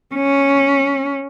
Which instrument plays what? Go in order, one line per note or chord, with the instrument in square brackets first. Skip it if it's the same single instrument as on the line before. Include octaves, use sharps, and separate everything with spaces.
[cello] C#4